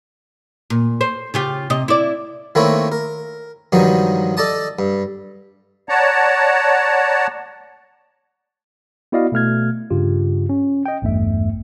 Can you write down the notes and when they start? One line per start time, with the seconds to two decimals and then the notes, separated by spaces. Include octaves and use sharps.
0.70 A#2
1.01 C5
1.34 C#3 F4 G4
1.70 C3 D#5
1.88 E4 D5
2.55 D#3 A3 A#3 C4 E4 C#5
2.92 A#4
3.72 G2 D#3 F3 F#3 D#4
4.37 A4 D5 D#5 A5 D#6
4.79 G2
5.89 C#5 D5 F#5 A5 A#5
9.12 B3 E4 F#4 D5 D#5 F5
9.32 B2 A3 F6 G#6
9.90 G2 C#3 F4 G4
10.49 C#4
10.86 D#5 G5
11.02 A1 E2 G2 A3 E5